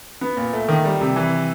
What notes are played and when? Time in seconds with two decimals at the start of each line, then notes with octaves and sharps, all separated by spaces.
0.21 B3
0.37 A#2
0.53 A3
0.69 D#3
0.85 G3
1.01 C3
1.16 E3